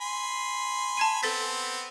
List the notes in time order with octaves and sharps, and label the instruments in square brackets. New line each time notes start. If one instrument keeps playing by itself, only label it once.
[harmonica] G#5 B5 C6
[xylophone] A5 G#6 D#7
[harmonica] B3 C4 [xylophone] A4 A6 B6